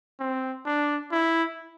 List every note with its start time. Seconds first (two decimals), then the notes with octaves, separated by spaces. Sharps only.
0.20 C4
0.65 D4
1.12 E4